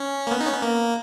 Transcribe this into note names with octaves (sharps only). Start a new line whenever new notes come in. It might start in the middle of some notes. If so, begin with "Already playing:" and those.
Already playing: C#4
A#3
B3
D#4
C#4
B3
A#3